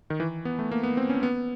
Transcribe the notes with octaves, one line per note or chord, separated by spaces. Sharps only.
D#3
E3
B3
A3
A#3
B3
C4
C#4
B3